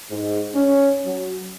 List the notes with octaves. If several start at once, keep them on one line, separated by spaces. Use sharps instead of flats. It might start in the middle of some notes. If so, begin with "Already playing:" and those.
G#2
C#4
F#3